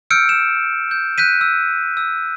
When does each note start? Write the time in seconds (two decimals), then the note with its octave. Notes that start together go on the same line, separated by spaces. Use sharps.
0.10 E6 F6 G6 C#7 D7
0.29 E7
0.91 G6
1.18 F#6 G6 B6 D#7
1.41 E6
1.97 E6